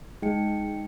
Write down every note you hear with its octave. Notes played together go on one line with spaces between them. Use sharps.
G#3 D#4 G5 C#7